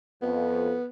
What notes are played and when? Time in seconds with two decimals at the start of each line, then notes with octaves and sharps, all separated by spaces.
0.22 F2 B3